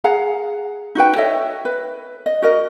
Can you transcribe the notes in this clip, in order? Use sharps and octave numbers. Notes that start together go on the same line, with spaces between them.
G#4 F5 F#5 A#5
D#4 F#4 B4 G5
A4 C#5 D#5 E5
B4
D#5
F#4 A#4 D#5